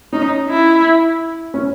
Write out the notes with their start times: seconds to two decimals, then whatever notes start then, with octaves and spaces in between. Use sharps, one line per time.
0.13 C#4 D#4
0.50 E4
1.54 C#4